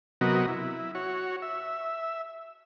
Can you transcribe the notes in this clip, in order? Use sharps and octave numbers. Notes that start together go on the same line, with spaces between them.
C3 F#3 B3 F#4 A#4 D#5
E4
F#4 C#5
E5